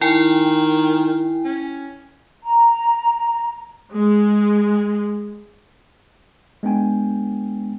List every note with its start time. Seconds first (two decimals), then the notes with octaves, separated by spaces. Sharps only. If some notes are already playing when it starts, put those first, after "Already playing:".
0.01 D#3 E4 G5 G#5
1.45 C#4
2.44 A#5
3.95 G#3
6.63 G#3 B3 D4 G5 G#5